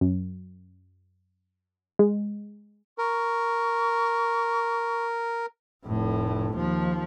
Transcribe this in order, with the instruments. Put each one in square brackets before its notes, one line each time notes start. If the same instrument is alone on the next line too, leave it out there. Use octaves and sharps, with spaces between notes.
[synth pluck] F#2
G#3
[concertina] A#4 [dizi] C#6
[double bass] F1 A2
D#2 F3